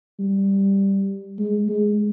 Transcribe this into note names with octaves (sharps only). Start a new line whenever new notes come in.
G3
G#3
G#3